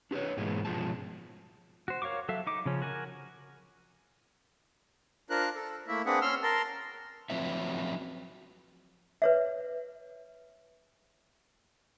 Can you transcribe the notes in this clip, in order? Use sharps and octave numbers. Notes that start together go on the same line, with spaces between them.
D4 G4 G#4 B4 C#5
G#2 B2 E3 G#3 A#3
G2 B2 F3 G#3 A5
F#4 C5
A#4 C#5 F5 C#6 D6
F#3 A4 E5 F5
D#4 D6
C#3 F3 C#4
F#4 A#4 G#5
D4 F4 A#4 C5 F#6
A4
A3 A#3 E4 E5
A#3 C4 D4 G#4 B4 F#5
C#4 C6 E6 F6
A#4 A5 C6
F3 F#3 C4 B4 C#5 E5
B4 C#5 E5